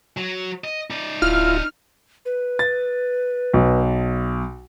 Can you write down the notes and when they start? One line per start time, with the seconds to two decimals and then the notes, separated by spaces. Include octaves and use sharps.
0.17 F#3
0.64 D#5
0.90 D#4 D5
1.22 D1 E4 F4 F6
2.26 B4
2.59 A6
3.54 B1